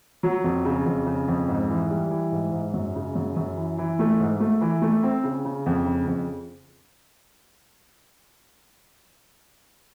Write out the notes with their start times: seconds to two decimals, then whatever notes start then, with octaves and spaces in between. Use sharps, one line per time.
0.23 F#3
0.44 F2
0.65 C#3
0.86 F2
1.06 C#3
1.28 F2
1.48 G#2
1.70 E3
1.90 G3
2.10 E3
2.32 G#2
2.52 G#2
2.74 F#2
2.95 C#3
3.15 F#2
3.36 F#2
3.57 E3
3.78 E3
3.99 A3
4.20 G#2
4.40 A3
4.61 E3
4.82 A3
5.03 C4
5.24 C#3
5.45 C#3
5.66 F2
5.86 C#3
6.07 F2